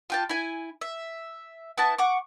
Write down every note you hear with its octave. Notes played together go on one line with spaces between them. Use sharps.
F4 G4 A5
E4 G#5
E5
B3 E4 A5
F#5 C#6 D6